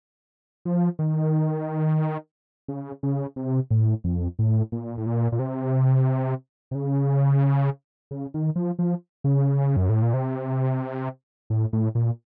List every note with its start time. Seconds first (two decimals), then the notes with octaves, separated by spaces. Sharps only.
0.65 F3
0.99 D#3
2.68 C#3
3.03 C#3
3.36 C3
3.71 A2
4.04 F2
4.39 A2
4.72 A#2
4.97 A2
5.07 A#2
5.32 A#2
5.39 C3
6.71 C3
6.75 C#3
8.11 C#3
8.34 D#3
8.56 F3
8.79 F3
9.24 C#3
9.76 F#2
9.89 A2
10.02 A#2
10.14 C3
11.50 A2
11.73 A2
11.95 A#2